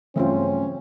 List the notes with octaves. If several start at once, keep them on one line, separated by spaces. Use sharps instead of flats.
G2 C#3 E3 F#3 A3 C4 C#4 F4